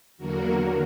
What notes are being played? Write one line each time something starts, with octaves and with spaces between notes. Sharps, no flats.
E2 D3 F#3 A#3 F#4 A#4